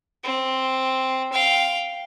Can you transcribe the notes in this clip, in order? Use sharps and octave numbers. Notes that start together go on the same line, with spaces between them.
C4
F5 G5